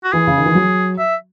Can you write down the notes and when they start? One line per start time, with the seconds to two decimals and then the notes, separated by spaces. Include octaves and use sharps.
0.04 F#4
0.13 E3 G#4
0.27 C#3
0.37 D#3
0.45 E3
0.55 F#3
0.99 E5